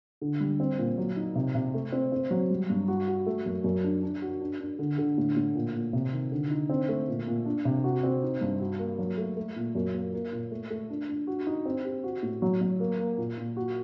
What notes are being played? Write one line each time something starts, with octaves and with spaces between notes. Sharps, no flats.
D3
G3
C4
A#2
F#3
D#4
C3
C3
A3
C4
C4
F#3
G3
G2
F#4
F#4
A3
F#2
F#2
D4
D4
F#4
D4
D4
D3
D3
A2
A2
A#2
A#2
C3
D#3
D3
D#4
C4
A3
A#2
A#2
D4
C3
F#4
C4
D#4
G2
F#4
A#3
F#3
A3
A3
A#2
F#2
A#3
A#3
A#2
A3
A3
D4
D4
F#4
D#4
C4
G4
F#4
A2
F#3
F#3
A#3
A#3
A#2
A#2
F#4